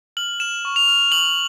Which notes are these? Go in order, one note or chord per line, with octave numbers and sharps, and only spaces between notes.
F6 F#7
F6 E7
C#6
F7
F6
C#6 F#7